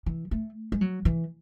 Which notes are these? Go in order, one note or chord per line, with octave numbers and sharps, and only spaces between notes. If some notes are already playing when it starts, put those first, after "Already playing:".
E3
A3
G#3
F#3
E3